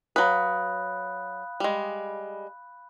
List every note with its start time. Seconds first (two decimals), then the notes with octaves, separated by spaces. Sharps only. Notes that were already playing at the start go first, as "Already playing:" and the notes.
0.16 F#3 B4 F5 G5 B5 D#6 F#6
1.60 G3 G#3